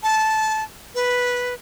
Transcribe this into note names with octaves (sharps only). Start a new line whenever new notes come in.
A5
B4